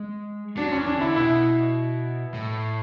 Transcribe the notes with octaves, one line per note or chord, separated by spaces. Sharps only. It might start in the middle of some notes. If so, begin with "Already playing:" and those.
Already playing: G#3
F#3 D4
C#4
E3
D4
D3 E4
B2 E4
A2